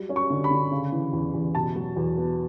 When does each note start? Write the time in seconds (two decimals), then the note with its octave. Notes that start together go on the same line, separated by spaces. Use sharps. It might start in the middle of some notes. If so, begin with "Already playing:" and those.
Already playing: F#3 G3
0.09 C#4
0.16 C#6
0.30 D3
0.44 B5
0.51 D3
0.71 C#3
0.92 E3
1.13 E2
1.34 E2
1.55 B2 A5
1.76 F#3
1.96 E2
2.17 B3